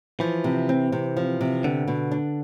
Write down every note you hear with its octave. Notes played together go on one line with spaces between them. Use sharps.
E3 F3
C3
C4
C3
F3
C3
D3 B3
B2
D4